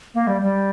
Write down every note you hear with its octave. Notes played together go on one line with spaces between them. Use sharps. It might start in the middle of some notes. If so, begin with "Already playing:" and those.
A#3
G3
G3